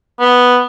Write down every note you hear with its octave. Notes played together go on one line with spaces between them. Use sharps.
B3